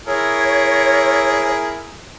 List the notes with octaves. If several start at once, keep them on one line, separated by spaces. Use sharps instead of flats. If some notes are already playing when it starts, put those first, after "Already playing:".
E4 G#4 A#4 C#5